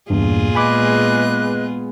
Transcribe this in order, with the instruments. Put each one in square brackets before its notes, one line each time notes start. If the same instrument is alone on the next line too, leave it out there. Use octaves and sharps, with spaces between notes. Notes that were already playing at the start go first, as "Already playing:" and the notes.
[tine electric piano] E2 G2 [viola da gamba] A#2 F4 G#4
[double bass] G#3 B3 [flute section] B4 D#5 F#6 [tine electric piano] G#5 B5 D6